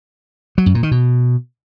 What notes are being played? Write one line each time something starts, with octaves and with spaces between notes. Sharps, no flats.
F#3
F#2
A#2
D#3
B2